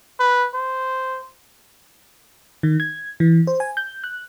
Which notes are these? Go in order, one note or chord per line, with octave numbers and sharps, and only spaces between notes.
B4
C5
D#3
G#6
E3
C5
G#5
G6
F#6